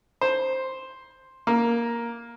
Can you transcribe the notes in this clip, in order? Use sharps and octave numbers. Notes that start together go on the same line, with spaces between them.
C5
A#3